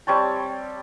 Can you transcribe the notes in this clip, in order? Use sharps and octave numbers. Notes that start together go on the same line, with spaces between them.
G3 C4 C#5 A5